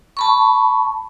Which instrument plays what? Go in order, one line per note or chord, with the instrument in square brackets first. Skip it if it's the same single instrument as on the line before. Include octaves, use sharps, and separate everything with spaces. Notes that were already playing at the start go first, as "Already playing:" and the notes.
[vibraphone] A5 B5 C#6